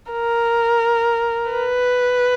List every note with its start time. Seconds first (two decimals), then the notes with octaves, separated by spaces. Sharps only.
0.12 A#4
1.51 B4